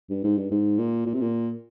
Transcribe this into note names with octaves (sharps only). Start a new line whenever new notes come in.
G2
G#2
G2
G#2
A#2
A#2
C3
A#2